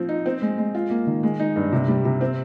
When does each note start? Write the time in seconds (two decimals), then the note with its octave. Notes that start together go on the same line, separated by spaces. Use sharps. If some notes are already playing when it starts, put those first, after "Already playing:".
Already playing: F3 C4
0.09 D#4
0.26 C4
0.42 G#3
0.58 G#3
0.75 F4
0.90 A#3
1.07 D#3
1.23 G#3
1.39 D#4
1.56 G2
1.72 C3
1.88 G3
2.05 C3
2.21 C4